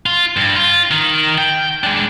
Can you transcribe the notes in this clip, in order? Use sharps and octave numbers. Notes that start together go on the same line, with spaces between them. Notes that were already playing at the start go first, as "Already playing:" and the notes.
F4
G2
F4
D#3
G5
G#3 D4